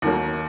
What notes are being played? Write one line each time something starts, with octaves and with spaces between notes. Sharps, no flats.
D#2 D#3 F#3 A#3